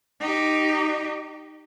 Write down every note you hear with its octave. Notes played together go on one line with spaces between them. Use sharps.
D#4 G4